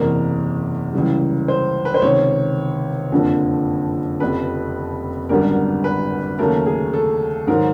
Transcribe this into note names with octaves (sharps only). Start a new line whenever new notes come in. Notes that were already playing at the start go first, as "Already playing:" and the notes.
Already playing: F#1 E2 C3 A#4
C#2 C#3 E3 G3
C5
B4
C5
C#2 C3 D#3 C#5
F#1 F2 D3 F3
F1 F2 C#3 B4
G#1 F#2 D3 G3 B3 A#4
B4
D#2 C#3 F#3 A3 A#4
G#4
A4
G#2 D#3 F#3 A#4